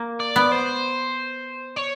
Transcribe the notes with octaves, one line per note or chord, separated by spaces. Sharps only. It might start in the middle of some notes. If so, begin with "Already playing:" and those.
Already playing: A#3
D5
B3
C5
C#5